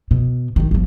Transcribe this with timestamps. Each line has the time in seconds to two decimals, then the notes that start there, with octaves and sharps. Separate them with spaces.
0.11 B2
0.56 G#1 D#3
0.71 G1 F3